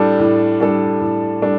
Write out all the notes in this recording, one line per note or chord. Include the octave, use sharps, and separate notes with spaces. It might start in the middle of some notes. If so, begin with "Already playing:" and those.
Already playing: A2 G3 D4 A4
A2
G3 D4 A4
A2
G3 D4 A4